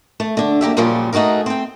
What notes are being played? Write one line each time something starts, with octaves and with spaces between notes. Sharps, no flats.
A3
D3 D4
F#2 A#3 G4 E5
F#2 A#2 C#3 F3 G3 C#4
A3 D#4 F#4 G#4 A#4
C4 G5